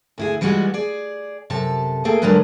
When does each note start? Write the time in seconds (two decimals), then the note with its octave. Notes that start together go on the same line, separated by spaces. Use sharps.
0.18 D2 E4 G#4
0.41 E3 G3 G#3 F4 F#4
0.74 G#4 D5
1.50 F#2 C3 A4 A5
2.05 A3 A#3 G#4 A4 G5
2.22 D3 F#3 G#3 D4 A#4 B4